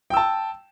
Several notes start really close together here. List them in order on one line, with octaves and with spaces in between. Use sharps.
G5 E6 A5